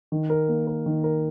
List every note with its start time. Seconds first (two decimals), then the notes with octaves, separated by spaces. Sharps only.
0.12 D#3
0.30 A#4
0.48 A#3
0.67 A#4
0.86 D#3
1.04 A#4